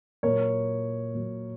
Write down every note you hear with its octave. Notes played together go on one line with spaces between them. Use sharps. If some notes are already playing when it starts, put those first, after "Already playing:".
A#2 F#3 A#4 C#5
A#2 F#3